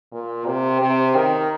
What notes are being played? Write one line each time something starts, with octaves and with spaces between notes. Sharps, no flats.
A#2
C3
C3
D#3